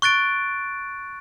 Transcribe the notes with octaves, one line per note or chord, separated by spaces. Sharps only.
C#6 F#6 A6 D7